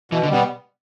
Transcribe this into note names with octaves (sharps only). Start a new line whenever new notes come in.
B2 E3
D3
B2 G3 B3